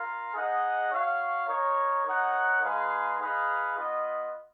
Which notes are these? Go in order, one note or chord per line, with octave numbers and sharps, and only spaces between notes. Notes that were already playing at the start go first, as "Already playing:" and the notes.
Already playing: F4 A#4 F5
D#4 G#4 D#5 F#5
F#4 C#5 F5
D#4 A#4 C#5
D#4 A#4 C#5 F#5
G#3 D#4 G#4 B4 F5
D#4 G#4 B4 F5
B3 F4 B4 D#5